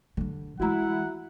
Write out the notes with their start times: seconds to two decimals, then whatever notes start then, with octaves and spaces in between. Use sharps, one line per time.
0.17 D3 G3
0.60 E3 G#3 E4 F#4 F#5 A#5